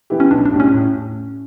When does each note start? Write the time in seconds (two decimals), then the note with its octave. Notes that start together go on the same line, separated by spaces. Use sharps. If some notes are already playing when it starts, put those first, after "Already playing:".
0.10 E3 B3 E4 G4
0.20 C#4
0.31 B1 D4
0.45 D4
0.53 A2 G3
0.60 C#4
0.74 A2